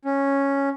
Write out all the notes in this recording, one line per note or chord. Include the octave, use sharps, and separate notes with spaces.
C#4